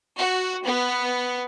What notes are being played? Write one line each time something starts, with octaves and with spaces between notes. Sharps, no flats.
F#4
B3